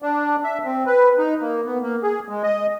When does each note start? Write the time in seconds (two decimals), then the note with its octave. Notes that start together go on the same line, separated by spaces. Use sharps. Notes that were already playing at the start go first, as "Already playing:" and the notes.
0.02 D4
0.44 E5
0.65 C4
0.86 B4
1.18 D#4
1.42 A#3
1.66 B3
1.82 A#3
2.03 G#4
2.29 G#3
2.43 D#5